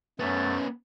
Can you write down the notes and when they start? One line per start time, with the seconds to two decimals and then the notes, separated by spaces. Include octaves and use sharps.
0.19 F#2 A3 B3 C#4 A6